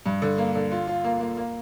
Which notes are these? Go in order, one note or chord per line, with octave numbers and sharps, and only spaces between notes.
G2
D3
A#3
D3
F4
F4
A#3
A#3
A#3